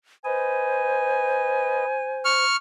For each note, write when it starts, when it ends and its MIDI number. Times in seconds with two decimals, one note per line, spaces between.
0.25 1.85 71
0.25 2.45 72
0.25 1.85 75
0.25 2.43 80
2.25 2.56 85
2.25 2.56 89